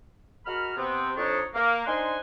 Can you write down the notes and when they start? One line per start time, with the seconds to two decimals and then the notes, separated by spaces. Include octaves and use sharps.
0.46 G#3 F#4 A#4 B5 F6
0.76 C3 B3 C4
1.17 F2 D4 D#4 C#5
1.55 A#3
1.85 D4 D#4 C5 F#5 G#5 C6